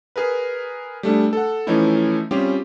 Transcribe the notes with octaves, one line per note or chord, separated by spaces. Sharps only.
G#4 A#4 B4
G3 A3 D4 G#4
A4 F#5
E3 F3 A3 C#4 D#4 E4
G3 C4 C#4 F4 G4 G#4